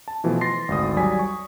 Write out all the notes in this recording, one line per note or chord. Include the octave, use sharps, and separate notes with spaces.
A5
B2 E3 F3 A3
C6 A6 A#6 C7
G#1 D2 D#6
F#3 G3 D5 G#5 B6
C#6